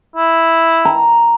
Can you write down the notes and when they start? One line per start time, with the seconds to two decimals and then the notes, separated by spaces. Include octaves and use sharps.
0.16 E4
0.85 A#5